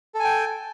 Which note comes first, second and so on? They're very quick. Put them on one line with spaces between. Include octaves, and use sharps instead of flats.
A4 G#5 G5